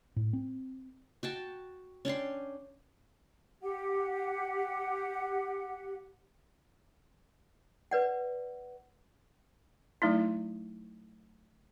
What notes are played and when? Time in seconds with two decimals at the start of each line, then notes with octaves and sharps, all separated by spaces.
0.16 A2
0.33 C4
1.23 F#4 G5 A5
2.05 C#4 D4 G5 C6
3.61 G4 F#5
7.91 B4 D5 F#5
10.02 F#3 A3 D#4 E4